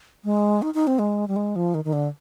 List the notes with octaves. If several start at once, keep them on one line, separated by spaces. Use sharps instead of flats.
G#3
D#4
D#4
C4
G#3
G3
G#3
F3
D#3
D#3
D3